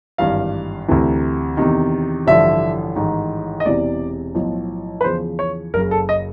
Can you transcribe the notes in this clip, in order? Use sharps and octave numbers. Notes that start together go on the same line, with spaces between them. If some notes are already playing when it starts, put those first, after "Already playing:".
G#1 G2 E3 F5
D2 C3 E3
E2 C3 D#3
A1 G2 D3 F3 E5
A1 G#2 D#3
D#5
E1 E2 C3 E3 D5
B1 A2 F3
B4
E2 C#3 F3 C5
C#5
F#1 F#2 C#3 A#4
A4
D#5